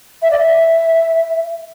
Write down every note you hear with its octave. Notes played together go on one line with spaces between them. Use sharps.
E5
D5
E5